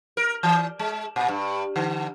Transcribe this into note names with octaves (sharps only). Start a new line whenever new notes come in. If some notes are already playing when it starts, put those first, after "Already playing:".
A#4
E3
G#3
A#2
G2
D3